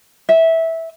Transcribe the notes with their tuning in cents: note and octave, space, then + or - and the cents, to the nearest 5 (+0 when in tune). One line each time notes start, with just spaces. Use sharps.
E5 -15